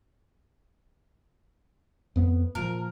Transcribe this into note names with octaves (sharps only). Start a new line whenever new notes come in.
F2 B3
A#2 F3 A#4